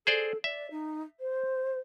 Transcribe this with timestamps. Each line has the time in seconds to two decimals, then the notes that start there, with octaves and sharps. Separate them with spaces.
0.07 G#4 A4 C5 D5
0.44 D5 E5
0.71 D#4
1.20 C5